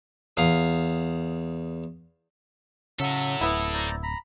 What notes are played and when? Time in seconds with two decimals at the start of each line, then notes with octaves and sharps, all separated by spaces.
0.37 E2 F5 D#6
3.00 A2 C#3 F#3 A4 E5
3.41 D1 B3 E4
3.74 C5 D5 A#5
4.03 A#5 B5